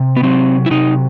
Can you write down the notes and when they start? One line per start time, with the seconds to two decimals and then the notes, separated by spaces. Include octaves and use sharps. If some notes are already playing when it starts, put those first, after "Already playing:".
Already playing: C3
0.17 B3
0.23 F#3 C4
0.66 E4
0.71 C3 D#4